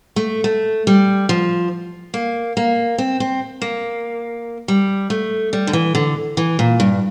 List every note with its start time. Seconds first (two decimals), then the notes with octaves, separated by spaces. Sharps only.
0.16 A3
0.44 A3
0.87 G3
1.29 F3
2.14 A#3
2.57 A#3
2.98 C4
3.20 C4
3.62 A#3
4.68 G3
5.10 A3
5.53 G3
5.67 D3
5.73 E3
5.95 D3
6.37 E3
6.59 A#2
6.80 G2